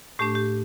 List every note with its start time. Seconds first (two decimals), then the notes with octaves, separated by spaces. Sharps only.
0.19 A2 A3 D4 G4
0.35 G4